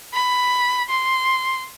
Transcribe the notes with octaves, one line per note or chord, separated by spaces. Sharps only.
B5
C6